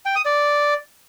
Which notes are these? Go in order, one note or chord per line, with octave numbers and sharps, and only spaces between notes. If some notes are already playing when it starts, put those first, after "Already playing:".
G5
D#6
D5